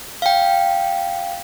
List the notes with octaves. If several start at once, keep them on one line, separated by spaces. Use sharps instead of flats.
F5 G5